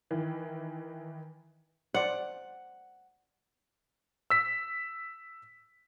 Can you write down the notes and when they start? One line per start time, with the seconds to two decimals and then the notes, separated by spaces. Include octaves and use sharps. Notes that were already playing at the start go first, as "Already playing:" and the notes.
0.11 D#3 E3
1.94 C5 D5 F#5
4.30 E6 B6